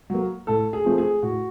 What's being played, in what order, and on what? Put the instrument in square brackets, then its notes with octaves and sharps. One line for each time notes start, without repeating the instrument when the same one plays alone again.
[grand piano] F#3 A#3
A2 A4
G#4
F3 A3 C4
G#4
A2 F#4